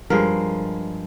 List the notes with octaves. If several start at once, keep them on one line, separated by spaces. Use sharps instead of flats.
G2 F3 G#3 A#4